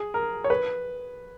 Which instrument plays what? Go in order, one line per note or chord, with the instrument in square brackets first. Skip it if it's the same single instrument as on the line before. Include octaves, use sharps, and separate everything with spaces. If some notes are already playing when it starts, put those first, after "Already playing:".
Already playing: [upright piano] G#4
A#4
C#5
B4